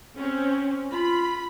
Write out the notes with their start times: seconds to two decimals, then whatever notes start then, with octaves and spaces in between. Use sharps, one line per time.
0.16 C4 C#4
0.92 F4 B5